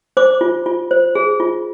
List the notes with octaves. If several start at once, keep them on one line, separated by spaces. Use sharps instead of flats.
C5 D6
F4
F4
C5
G#4
F4